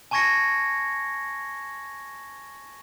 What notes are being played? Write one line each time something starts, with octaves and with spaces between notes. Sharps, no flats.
G#5 A5 C#6 G#6 A#6 C#7